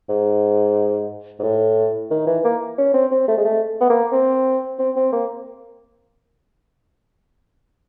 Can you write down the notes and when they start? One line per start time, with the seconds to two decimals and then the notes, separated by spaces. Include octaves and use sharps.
0.09 G#2
1.39 G#2
1.43 A2
2.11 D#3
2.27 E3
2.45 A#3
2.78 C#4
2.94 C4
3.12 C4
3.28 A3
3.38 G#3
3.45 A3
3.81 B3
3.90 A#3
4.12 C4
4.79 C4
4.96 C4
5.13 A#3